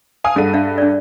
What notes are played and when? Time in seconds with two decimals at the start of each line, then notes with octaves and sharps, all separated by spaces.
0.24 F5 G#5 A5 D#6
0.36 G2 G#4 A4 F#5 D#7
0.53 D4 E5 F5
0.78 D4 D5